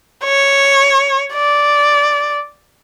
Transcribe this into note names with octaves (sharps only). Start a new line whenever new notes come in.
C#5
D5